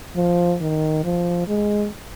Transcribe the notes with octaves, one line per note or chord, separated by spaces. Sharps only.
F3
D#3
F3
G#3